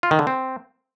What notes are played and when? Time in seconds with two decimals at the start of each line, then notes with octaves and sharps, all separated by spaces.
0.03 F4
0.11 D#3
0.19 D3
0.27 C4